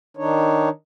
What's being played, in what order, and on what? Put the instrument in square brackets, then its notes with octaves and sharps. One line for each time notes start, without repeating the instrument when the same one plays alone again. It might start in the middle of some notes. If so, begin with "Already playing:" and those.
[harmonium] D#3 D4 D#4 C#5